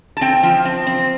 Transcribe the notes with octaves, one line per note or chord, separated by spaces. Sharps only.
A5
C4 G5
F3
C4
C4